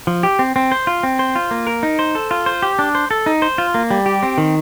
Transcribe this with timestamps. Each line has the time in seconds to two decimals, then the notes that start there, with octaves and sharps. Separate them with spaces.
0.07 F3
0.23 G4
0.39 C4
0.56 C4
0.72 C5
0.87 F4
1.03 C4
1.19 C5
1.35 F4
1.51 A#3
1.67 A#4
1.83 D#4
1.99 C5
2.15 A4
2.31 F4
2.46 C5
2.62 G4
2.79 D4
2.95 C5
3.11 A4
3.26 D#4
3.42 C5
3.58 F4
3.74 A#3
3.91 G3
4.06 G4
4.23 C4
4.38 D#3